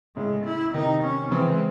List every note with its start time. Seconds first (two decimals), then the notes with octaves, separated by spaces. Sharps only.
0.16 A2 C#3 G#3
0.45 E4
0.74 C3 D#3 D#4
1.03 C#4
1.31 C#3 E3 C4
1.50 G#3